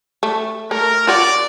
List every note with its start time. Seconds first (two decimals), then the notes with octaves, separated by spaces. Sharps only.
0.23 A3
0.71 A3 A#4
1.07 F4 C#5 D5 F#5